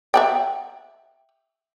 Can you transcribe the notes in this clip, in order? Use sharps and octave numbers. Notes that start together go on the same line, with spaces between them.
E5 F#5 G5